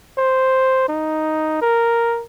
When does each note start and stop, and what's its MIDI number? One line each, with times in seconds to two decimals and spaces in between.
0.18 0.86 72
0.88 1.59 63
1.62 2.24 70